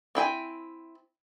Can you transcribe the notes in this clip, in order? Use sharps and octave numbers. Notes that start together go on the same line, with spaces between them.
C4 E4 G5 G#5